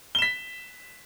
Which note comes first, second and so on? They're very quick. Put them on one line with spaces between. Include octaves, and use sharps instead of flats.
G7 E7 B6